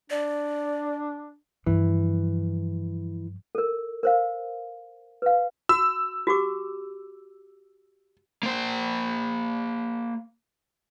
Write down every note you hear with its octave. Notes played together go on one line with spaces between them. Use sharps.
D4 D5
G2 E3 F3
A4 A#4
A#4 C5 F5
B4 F5
F#4 E6
F#4 G4 D6
A#3 C5